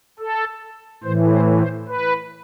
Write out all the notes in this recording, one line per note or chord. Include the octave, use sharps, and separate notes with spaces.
A4
A2 E3 C5
C5
C5
B4